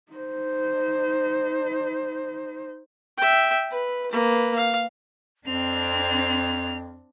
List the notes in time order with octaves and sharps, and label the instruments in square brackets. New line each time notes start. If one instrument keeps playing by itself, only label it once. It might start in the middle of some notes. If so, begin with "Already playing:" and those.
[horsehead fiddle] D#4 C5
[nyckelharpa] E5 G5
B4
A#3 B4
F5
[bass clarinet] F2 [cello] C4 D4 [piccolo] F7